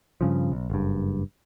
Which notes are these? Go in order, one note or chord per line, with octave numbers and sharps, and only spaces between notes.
G2 C#3 F3
B1
F#1 G2